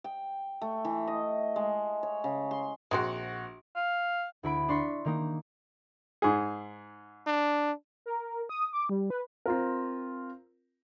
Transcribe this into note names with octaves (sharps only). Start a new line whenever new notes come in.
G5
A3
E3
D#5
G#3
C#5
C#3
C6
A#1 G#3 C4 F#4 C5 F#5
F5
D2 E4 B5 D7
D4 C6 C#6 B6
D#3 A#3 D#4
G#2 G#4
D4
A#4
D#6
D6
G3
B4
C4 F4 A#4